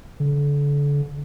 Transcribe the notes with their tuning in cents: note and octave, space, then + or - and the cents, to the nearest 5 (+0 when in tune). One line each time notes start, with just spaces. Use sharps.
D3 -35